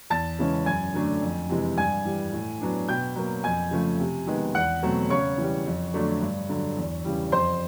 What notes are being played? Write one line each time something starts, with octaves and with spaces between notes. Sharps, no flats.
E2 A5 A6
C#3 E3 G#3 C#4
F#2 G#5 G#6
D3 F#3 A3 D4
F2
C3 E3 G#3
G2 G#5 G#6
E3 G3
A2
F#3 B3 D4
B2 G5 G6
F#3 A#3
F2 G#5 G#6
C#3 F3 A3
C3
D#3 G#3 B3
E2 F#5 F#6
B2 F#3 A3 C4
C#3 C#5 C#6
E3 G3
F2
D3 F#3 A3 D4
G2
D3 F#3
E2
C#3 E3 G3
F2 C5 C6